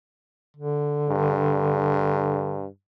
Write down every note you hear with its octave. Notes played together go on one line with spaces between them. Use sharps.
D3
G2